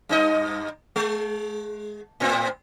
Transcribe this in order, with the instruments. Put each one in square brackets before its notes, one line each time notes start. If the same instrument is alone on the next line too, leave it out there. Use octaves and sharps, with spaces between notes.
[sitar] G2 D#4 D#5
G#3
A2 C4